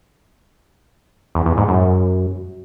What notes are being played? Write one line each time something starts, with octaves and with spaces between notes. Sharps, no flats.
E2
E2
G#2
F#2